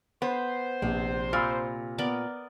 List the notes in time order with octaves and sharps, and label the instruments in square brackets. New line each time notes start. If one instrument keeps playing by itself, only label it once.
[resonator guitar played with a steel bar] B3 [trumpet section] C5
[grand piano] A#1 [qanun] C3
[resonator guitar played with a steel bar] A#2 [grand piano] B5 E6 F6
[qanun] B3 A#4 D5